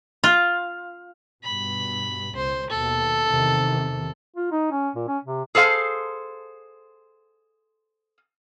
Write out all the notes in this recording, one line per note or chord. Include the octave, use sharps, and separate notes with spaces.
F4
G2 B2 B5
C#2 C5
D#2 B2 A4
E2 C3 D#3
F4
D#4
C#4
A#2
C#4
C3
G#4 A4 C5 F5